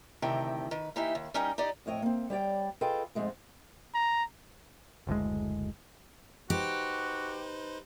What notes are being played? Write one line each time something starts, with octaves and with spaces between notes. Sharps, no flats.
D2 A2 C3 D#3 G4 G5
D#3 B4
E3 A#3 D#4 G4 E5
D#2
G3 C#4 D#4 A#4 G5
D#4 G4 D5 D#5
F2 A2 C#5 D#5 G5
A#3 C4
G3 C#5 D5 G5
F4 G#4 A4 B4 D#5 G5
F2 G#2 G#3 A3
A#5
F#1 D2 A2 G#3
D#4 F#4 G4 B4 C5